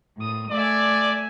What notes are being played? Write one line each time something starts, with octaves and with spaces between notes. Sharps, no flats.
A2 D#6
A3 D5 E5 G#5